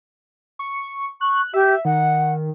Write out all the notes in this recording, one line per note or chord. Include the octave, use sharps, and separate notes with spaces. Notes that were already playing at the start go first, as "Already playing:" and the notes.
C#6
C#6 F#6
G4 E5
D#3 F#5